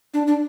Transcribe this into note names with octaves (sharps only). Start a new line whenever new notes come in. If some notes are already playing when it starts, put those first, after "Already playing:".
D4
D4